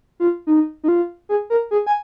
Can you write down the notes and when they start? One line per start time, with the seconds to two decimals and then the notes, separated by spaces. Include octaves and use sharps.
0.20 F4
0.47 D#4
0.84 D#4
0.88 F4
1.29 G#4
1.50 A#4
1.71 G#4
1.87 G#5